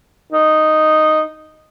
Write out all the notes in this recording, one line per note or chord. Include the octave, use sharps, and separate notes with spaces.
D#4